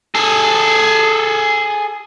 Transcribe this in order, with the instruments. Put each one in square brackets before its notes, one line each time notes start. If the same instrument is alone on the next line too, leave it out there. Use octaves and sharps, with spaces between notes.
[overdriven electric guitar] G#4 A4